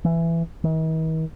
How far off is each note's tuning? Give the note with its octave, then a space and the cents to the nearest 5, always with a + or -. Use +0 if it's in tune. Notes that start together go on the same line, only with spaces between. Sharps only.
E3 +15
D#3 +45